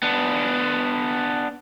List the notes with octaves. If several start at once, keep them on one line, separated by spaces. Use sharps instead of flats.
B3 D4